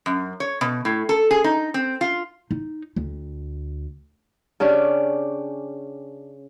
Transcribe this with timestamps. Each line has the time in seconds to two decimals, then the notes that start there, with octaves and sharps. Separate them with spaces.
0.06 F#2
0.40 C#5
0.61 B2
0.85 A2
1.09 A4
1.31 G#4
1.44 D#4
1.74 C4
2.01 F4
2.51 D#4
2.96 D2
4.60 C#3 C#4 D4 G4